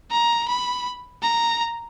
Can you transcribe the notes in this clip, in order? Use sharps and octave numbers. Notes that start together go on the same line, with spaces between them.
A#5
B5
A#5